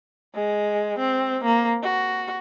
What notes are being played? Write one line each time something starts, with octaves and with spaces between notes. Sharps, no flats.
G#3
C4
A#3
F#4